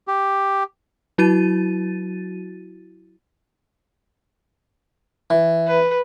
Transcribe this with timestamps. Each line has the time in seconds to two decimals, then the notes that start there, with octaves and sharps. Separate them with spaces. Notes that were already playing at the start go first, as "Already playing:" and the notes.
0.08 G4
1.18 F#3 E4 F#4 A6 D#7
5.30 E3
5.67 B4